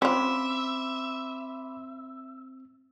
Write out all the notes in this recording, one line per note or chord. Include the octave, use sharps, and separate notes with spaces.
C4 C#4 F4 E5 B5 C6 D6